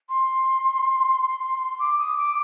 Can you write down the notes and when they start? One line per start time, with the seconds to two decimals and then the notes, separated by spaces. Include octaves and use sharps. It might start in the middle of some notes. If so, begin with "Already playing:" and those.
0.09 C6
1.79 D6
1.98 D#6
2.17 D6